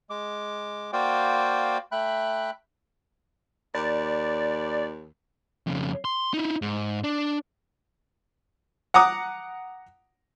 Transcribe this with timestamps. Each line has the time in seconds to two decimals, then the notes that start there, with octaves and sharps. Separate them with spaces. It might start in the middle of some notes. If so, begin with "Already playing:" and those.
0.10 G#3 D6
0.93 A#3 F#4 C5 D5 F5 G5
1.92 A3 E5 G5 B5 F#6
3.75 D#2 D5
5.67 F2 C#3
6.05 C6
6.33 D#4 E4
6.62 G#2
7.04 D4
8.94 F#5 A#5 D6 D#6